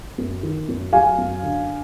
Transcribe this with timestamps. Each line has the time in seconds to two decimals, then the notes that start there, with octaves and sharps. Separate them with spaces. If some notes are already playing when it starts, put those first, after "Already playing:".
0.18 F#2
0.43 D#3
0.68 F#2
0.93 F#3 F5 G#5
1.18 F#2
1.43 D3